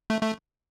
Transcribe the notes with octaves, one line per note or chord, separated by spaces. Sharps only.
A3
A3